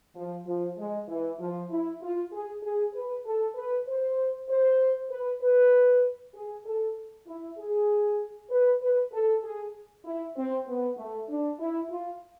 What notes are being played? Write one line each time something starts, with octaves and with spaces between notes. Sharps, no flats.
F3
F3
G#3
E3
F3
E4
F4
G#4
G#4
B4
A4
B4
C5
C5
B4
B4
G#4
A4
E4
G#4
B4
B4
A4
G#4
E4
C4
B3
A3
D4
E4
F4